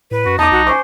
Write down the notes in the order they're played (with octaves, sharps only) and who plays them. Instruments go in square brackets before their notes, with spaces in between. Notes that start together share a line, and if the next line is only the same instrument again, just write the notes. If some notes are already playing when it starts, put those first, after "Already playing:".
[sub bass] A2 [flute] B4
[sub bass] F#2 [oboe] F#4
[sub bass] E2 [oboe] D#4 [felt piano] A5 D6 [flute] D#6
[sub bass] B1 [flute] F#4
[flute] C5 [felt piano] G#5 C#6 D6